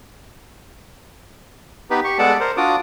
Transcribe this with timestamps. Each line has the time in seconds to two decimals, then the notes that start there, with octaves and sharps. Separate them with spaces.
1.90 B3 D#4 G4 B4
2.04 G4 C#6
2.19 G#3 B3 A4 D5 F#5 A5
2.40 A#4 C5
2.57 D4 F4 F#4 D5 D6 D#6